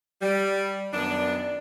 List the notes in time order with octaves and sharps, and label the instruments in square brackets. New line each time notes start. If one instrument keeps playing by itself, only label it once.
[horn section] G3
F#2 D#3 B3 D4